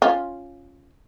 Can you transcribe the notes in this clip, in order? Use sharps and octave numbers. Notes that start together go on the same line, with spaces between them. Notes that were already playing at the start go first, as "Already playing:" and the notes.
C#4 F4